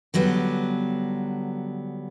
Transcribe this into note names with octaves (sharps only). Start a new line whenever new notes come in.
D3 F#3 G3 B3